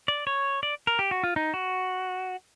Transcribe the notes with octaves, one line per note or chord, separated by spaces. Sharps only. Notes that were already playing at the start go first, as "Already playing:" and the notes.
D5
C#5
D5
A#4
G4
F#4
F4
D#4
F#4